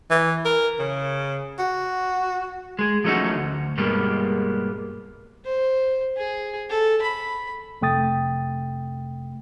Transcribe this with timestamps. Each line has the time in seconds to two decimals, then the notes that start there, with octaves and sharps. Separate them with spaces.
0.10 E3
0.45 A#4
0.79 C#3
1.59 F#4
2.79 G#3 G#4
3.04 F3 F#3 A3 C#4 D#4 F#4
3.35 D2
3.77 G2 B2 G3 G#3 A#3 B3
5.45 C5
6.17 G#4
6.69 A4
7.02 B5
7.81 F2 C3 A3 G5 D#6 A6